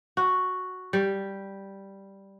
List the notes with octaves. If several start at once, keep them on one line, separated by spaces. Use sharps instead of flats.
F#4
G3